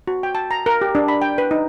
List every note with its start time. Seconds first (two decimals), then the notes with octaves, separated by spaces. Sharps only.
0.08 F#4
0.23 G5
0.35 A5
0.51 A#5
0.66 A#4
0.81 G4
0.95 D4
1.08 B5
1.22 G5
1.38 B4
1.51 D#4